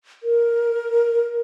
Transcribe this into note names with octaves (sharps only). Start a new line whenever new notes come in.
A#4